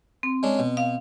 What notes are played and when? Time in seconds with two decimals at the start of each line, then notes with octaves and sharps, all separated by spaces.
0.23 C4
0.43 G#3 C#4 D4
0.59 B2
0.77 F5